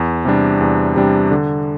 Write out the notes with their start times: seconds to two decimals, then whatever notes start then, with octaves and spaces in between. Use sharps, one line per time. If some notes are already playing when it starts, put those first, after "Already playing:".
Already playing: E2
0.25 C3 G3 D4
0.61 E2
0.96 C3 G3 D4
1.31 D3